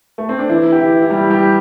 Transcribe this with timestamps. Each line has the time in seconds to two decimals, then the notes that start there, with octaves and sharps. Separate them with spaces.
0.18 A3
0.29 C4
0.39 D4
0.50 E3 E4
0.72 G4
0.80 E3 E4
1.02 E4
1.10 G3 G4
1.30 G3 G4